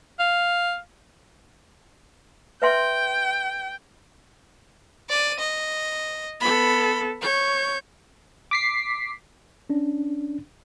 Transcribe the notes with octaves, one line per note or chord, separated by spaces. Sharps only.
F5
B4 E5 G5 C6
D5 D#7
D#5
B3 A4 B5
C#5 G6
D6 B6 C7
C#4 D4